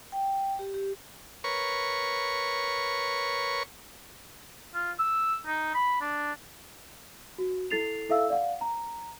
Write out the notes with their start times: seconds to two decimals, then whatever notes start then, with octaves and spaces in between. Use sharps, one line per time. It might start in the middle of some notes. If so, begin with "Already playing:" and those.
0.12 G5
0.59 G4
0.74 G4
1.44 A#4 B4 C#5 C#6
4.74 F4
4.99 E6
5.47 D#4
5.75 B5
6.01 D4
7.38 F#4
7.70 E4 A4 A6 C7 F7
8.09 E4 A4 E5 F5 E6
8.30 D5 F5 F#5
8.61 A#5